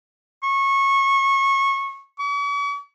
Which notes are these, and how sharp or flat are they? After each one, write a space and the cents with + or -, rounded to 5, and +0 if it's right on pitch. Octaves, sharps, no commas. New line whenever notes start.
C#6 -20
C#6 +45